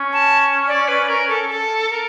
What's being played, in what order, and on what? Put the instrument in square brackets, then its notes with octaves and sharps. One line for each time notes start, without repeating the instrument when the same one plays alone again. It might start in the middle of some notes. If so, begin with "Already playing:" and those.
Already playing: [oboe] C#4
[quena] A5
D5
B4
A#4
A4
A4
A#4